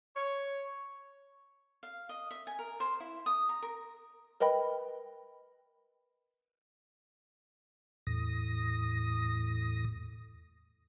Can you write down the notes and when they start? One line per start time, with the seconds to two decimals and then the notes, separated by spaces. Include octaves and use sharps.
0.16 C#5
1.83 F5
2.09 D#5
2.31 E5
2.47 G#5
2.59 A#4
2.80 C5
3.00 E4
3.26 D#6
3.49 A#5
3.62 A#4
4.40 A#4 B4 D#5 G5 B5
8.07 E2 A2 D#6 A#6